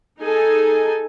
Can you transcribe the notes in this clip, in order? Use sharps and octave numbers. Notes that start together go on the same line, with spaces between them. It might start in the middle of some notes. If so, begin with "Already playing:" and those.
D#4 G#4 A4 G#5